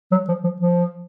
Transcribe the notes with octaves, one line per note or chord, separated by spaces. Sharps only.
F#3
F3
F3
F3